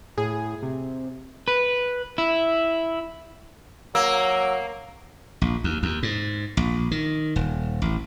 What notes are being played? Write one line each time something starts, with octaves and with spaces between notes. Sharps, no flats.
A2 G#4
C3
B4
E4
F#3 A#3 E6
A#1
D#2
D#2
G#2
A#1
D#3
D#1
A1